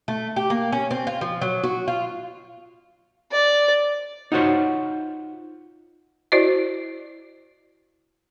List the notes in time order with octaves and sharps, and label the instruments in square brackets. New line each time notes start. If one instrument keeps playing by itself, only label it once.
[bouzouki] A3
G4
A#3
C#4
C4
F4
F3
F#3
F#4
F4
[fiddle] D5
[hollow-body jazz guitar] D#4 F4 F#4 C5 C#5
[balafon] E4 F#4 C5 D5 D#5